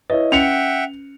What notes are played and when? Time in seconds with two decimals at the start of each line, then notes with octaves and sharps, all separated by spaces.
0.10 E4 B4 C#5 D#5
0.32 C#4 E5 F#5 G5 C#7 F7